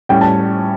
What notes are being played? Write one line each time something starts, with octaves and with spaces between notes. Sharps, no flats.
A2 G3 C#4 G5
A5